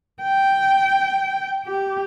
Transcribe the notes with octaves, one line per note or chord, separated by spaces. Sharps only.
G5
G4